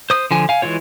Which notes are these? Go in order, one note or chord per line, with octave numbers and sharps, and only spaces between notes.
C5 D#6
D3 F3 G#5
F5 G#5
E3 G#3 F4 C#5